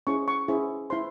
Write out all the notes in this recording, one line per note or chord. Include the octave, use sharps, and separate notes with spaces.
C#4 E4 G#4 C5 C#6
C#6
C#4 E4 G#4 C5
E4 C5 C6